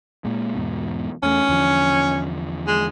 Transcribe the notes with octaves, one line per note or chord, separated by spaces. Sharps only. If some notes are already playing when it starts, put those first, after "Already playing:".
A#2 G#3
E2 G#2 B2
E2 A3 C#4
E2 D3 F3
G#3